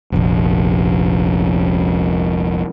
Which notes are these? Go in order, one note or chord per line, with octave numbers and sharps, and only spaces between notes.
F1 A#1